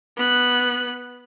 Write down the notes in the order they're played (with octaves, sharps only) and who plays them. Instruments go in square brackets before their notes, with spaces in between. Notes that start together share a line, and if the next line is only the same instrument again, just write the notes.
[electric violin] B3 F#6